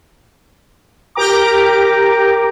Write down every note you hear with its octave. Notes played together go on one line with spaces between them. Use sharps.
G4 A#4 G5 A#5 D6